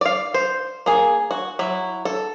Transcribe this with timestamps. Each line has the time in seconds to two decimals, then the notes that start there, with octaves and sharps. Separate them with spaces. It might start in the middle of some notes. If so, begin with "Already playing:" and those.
0.01 D5 F5
0.34 C5
0.86 A#3 G#4
1.31 F#4
1.59 F#3 E4
2.05 A4